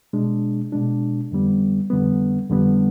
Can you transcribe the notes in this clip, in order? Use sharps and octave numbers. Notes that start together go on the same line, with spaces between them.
B2 G#3 D4
B2 G#3 D4
F2 D3 G3 B3
F2 D3 G3 B3
F2 D3 G3 B3